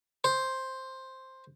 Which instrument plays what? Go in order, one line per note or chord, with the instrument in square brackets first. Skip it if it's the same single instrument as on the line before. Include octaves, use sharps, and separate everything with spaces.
[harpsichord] C5